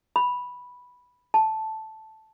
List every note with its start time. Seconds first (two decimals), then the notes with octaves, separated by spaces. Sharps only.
0.16 B5
1.34 A5